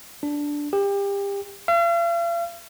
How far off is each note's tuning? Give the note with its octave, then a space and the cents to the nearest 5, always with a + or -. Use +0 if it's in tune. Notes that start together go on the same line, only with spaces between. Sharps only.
D4 -5
G4 +30
F5 -45